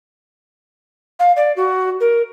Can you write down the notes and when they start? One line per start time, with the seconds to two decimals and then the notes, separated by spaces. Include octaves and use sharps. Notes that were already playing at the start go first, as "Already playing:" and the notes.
1.19 F5
1.36 D5
1.56 F#4
2.00 A#4